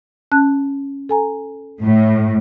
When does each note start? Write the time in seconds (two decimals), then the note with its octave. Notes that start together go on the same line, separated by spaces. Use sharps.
0.32 C#4 A5 F#6
1.09 A4 G#5 A#5
1.84 A2